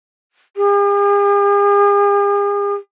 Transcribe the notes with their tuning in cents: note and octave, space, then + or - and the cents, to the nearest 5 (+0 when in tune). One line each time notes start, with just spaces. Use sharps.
G#4 -45